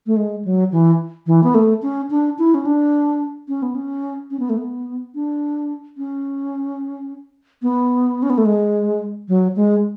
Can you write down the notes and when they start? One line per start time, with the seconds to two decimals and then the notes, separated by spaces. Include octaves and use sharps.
0.06 A3
0.16 G#3
0.45 F#3
0.71 E3
1.27 E3
1.43 B3
1.54 A3
1.82 C#4
2.10 D4
2.38 E4
2.54 C#4
2.65 D4
3.48 C#4
3.62 B3
3.75 C#4
4.30 C#4
4.39 B3
4.49 A3
4.57 B3
5.15 D4
5.97 C#4
7.62 B3
8.22 C#4
8.30 B3
8.38 A3
8.45 G#3
9.28 F#3
9.56 G#3